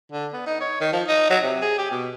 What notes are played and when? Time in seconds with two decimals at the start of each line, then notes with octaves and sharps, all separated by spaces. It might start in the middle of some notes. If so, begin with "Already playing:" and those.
0.12 D3
0.34 B3
0.47 D#4
0.61 C#5
0.81 D#3
0.93 F3
1.08 D#4
1.30 F#3
1.43 C3
1.62 G#4
1.78 G4
1.91 B2